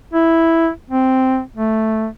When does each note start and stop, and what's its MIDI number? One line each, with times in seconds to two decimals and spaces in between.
0.13 0.69 64
0.90 1.41 60
1.56 2.07 57